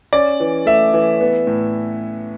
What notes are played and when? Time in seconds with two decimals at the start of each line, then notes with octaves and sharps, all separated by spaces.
0.13 C#4 D5
0.40 E3
0.66 A3 E5
0.93 E3
1.21 B3
1.47 A2